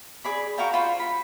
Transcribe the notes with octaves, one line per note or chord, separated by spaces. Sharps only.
G#4 D5 B5
F#4 A#4 F5 G5
F4 C5 B5
B5